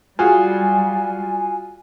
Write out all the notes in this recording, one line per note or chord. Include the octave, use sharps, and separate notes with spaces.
G3 F4 F#4 G#4 G#5